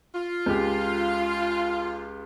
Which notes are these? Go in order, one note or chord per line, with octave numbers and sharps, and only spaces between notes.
F4
C#2 G4